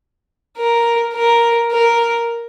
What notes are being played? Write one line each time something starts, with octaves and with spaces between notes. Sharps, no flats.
A#4
A#4
A#4